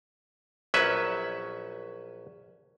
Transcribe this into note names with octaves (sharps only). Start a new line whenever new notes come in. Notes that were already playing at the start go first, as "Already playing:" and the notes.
A#1 F#3 C#4 B4 E5